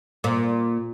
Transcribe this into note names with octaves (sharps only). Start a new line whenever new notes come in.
A#2